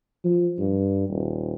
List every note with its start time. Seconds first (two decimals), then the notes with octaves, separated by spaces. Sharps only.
0.24 F3
0.58 G2
1.09 D#1